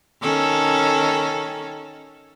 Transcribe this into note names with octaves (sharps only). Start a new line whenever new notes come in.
D#3 C#4 A4